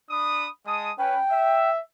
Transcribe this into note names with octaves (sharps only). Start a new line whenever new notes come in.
D4 B5 D#6
G#3 A5 D#6
C#4 B4 G5
E5